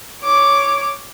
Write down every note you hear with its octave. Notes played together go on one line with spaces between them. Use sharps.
C#5 D6